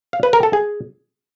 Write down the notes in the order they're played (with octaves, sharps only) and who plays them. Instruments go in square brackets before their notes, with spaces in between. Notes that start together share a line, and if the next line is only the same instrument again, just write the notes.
[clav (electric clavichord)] F5
B4
A#4
A4
G#4